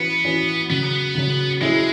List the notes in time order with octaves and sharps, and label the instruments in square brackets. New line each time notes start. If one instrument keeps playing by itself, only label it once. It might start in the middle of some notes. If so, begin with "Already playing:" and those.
Already playing: [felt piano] E3 C#4 F#4 B4 [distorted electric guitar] B3
[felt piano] E3 C#4 F#4 B4
[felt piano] F#2 C#3 F#3 [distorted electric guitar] B3
[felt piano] F#2 C#3 F#3
[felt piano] F#3 C#4 E4 G#4 [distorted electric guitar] G#3